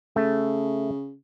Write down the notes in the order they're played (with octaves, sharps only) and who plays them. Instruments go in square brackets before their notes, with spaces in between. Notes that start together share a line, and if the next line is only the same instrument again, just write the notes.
[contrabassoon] C#3 [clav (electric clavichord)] A3